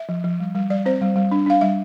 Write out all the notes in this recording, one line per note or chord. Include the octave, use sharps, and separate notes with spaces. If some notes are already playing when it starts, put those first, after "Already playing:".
Already playing: E5
F3
F3
G3
G3
G3 D5
C4 C5
G3
G3
D4
D4 F5
G3 E5